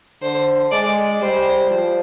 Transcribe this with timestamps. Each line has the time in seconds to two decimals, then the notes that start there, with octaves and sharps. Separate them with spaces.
0.22 D3 C5
0.72 G#3 D5
1.21 G3 C5
1.71 F3